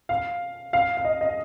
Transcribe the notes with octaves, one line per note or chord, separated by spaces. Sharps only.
F5
F5
F5
D#5
D#5